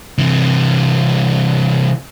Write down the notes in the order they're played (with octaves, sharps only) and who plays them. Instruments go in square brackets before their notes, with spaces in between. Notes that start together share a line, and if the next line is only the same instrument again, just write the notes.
[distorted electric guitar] C3 E3